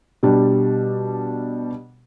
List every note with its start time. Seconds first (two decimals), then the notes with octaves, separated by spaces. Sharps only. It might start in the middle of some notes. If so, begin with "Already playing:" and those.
0.23 B2 G3 D4